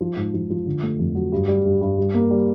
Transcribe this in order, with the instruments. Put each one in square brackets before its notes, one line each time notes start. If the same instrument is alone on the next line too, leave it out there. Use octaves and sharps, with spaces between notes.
[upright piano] F3
G#2
F3
F3
D3
A3
F2
F#3
G2
G3
G2
G2
G3
A#3
G3